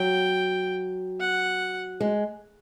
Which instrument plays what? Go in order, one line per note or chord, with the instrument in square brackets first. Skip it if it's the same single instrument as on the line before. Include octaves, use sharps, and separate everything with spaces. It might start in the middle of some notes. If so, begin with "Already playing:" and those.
Already playing: [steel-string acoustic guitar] F#3 [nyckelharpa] G5
[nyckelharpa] F#5
[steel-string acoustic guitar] G#3